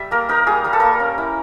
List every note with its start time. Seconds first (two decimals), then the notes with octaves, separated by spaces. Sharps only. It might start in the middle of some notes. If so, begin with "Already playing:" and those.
Already playing: G3 E5
0.11 A#3 A#4
0.29 D#4 A#4
0.47 G3 G#4
0.64 G3 A#4
0.73 A4
0.80 A#3 A#4
1.00 C#4
1.18 E4